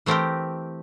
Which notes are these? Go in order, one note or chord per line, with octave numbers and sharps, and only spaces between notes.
E3 A3 C4 G4 A#4